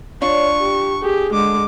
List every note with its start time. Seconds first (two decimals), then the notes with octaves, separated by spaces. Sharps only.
0.22 D4 F4 C#5 C#6
0.60 G4
1.02 G4 G#4
1.33 D3 G#3 D6